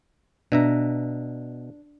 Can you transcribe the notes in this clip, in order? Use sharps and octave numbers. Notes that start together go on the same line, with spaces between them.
B2 D4 E5 A#5